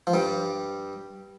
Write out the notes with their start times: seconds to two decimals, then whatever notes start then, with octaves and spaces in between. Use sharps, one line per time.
0.07 F3
0.13 G2 G3